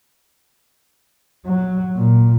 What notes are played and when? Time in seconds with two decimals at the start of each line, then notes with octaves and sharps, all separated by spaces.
1.46 F#3
1.96 A#2